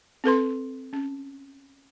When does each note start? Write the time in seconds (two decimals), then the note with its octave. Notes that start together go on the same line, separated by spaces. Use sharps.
0.24 C4 A4 B4 C6
0.93 C#4